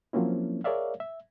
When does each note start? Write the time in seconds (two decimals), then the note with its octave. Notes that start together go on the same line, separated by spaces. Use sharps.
0.13 F3 F#3 A#3 C4 C#4 E4
0.64 G#4 A#4 C#5 D5 E5 F5
1.00 E5